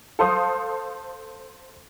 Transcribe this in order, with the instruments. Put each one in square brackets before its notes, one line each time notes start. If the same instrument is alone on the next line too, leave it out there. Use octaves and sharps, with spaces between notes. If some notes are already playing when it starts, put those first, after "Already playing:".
[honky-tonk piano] A4 C5 F5 C6 D#6